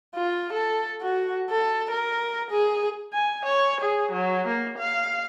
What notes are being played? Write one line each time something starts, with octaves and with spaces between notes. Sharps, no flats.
F4
A4
F#4
A4
A#4
G#4
G#5
C#5
G#4
F#3
A#3
F5